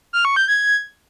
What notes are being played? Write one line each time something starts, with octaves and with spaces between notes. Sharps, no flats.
F6
C#6
G6
G#6